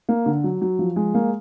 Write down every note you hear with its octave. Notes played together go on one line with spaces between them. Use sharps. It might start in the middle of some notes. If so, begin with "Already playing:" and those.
A#3
D3
F#3
F#3
F3
G#3
A#3